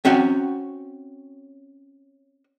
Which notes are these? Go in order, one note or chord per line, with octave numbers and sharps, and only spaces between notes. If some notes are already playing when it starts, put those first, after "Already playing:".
C4 C#4 F#4 F#5 G5